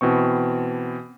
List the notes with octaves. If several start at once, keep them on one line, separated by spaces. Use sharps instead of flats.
B2 E3 C4 C#6